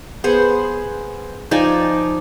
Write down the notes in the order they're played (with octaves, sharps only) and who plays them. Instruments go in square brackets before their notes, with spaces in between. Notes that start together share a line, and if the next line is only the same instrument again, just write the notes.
[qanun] B3 G#4 C5 F#5
F3 D#4 D5 G#5